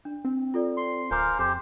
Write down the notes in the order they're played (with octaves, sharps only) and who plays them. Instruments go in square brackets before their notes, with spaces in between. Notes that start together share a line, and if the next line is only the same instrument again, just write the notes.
[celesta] D4
[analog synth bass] C4
[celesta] F4 A4 D5
[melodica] C6
[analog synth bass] D1 [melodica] A#4 C5 F5 [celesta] G#5 D6 F6
[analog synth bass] F2 [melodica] G4 C5